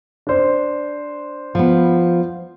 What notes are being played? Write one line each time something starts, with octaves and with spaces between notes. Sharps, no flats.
D4 C5
F3 B3